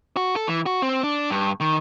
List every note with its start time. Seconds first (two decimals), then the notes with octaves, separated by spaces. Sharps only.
0.17 F#4
0.36 A4
0.47 E3
0.66 F#4
0.82 C4
1.03 D4
1.31 G2
1.60 D#3